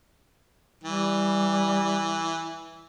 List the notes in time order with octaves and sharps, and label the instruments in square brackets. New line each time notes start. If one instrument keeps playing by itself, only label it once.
[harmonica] E3 [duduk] G3